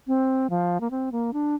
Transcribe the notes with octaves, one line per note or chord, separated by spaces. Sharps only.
C4
F3
A#3
C4
A#3
D4